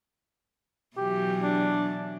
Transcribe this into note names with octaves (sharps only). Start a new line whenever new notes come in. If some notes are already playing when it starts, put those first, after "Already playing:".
B2 E3 F#3 G4
D4